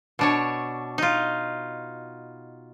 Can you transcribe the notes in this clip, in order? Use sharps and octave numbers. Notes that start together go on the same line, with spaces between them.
B2 D4 C#5
D#4 F4